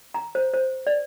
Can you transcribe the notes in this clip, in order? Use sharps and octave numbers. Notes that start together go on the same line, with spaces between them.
A#5
C5
C5
D5